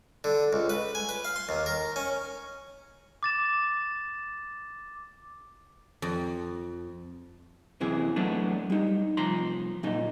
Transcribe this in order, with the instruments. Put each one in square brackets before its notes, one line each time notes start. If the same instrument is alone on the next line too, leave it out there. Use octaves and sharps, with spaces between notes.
[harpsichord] D3
C#2
B4
G#5
B4
F5
C6
D#2
A#4
C#4
[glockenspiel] D6 A6 E7
[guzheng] F2
[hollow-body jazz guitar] F#2 C3 E3 G#4
F#3 A3 B3 D4
G3 D#4
C2 F3 A#5 C6
F#2 A#2 D#4